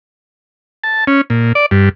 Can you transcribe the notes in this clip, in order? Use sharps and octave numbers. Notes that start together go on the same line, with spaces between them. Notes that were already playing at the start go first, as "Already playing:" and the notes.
A5
C#4
A#2
D5
G2